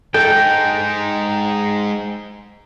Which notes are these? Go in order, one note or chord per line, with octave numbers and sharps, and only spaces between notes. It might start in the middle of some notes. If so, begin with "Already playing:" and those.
G#3 D#4 A4 G5